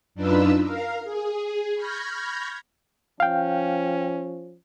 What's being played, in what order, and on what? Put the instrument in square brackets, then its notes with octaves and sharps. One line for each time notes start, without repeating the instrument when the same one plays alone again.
[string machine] F#2 D4 D#4 F4 B4 E6
A#4 F5
G#4
B5 C#6 F6 G6 G#6 A#6
[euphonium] F3 [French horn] C#4 [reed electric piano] F5 G5